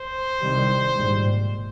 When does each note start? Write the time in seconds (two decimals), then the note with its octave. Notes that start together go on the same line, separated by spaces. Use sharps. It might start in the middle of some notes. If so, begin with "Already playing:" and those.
Already playing: C5
0.42 C2 C3 D#3 G3
0.94 A#1 G#2 G3